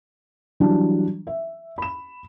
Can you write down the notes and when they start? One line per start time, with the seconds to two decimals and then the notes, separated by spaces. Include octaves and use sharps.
0.60 E3 F#3 G3 D4
1.27 E5
1.78 B5 E7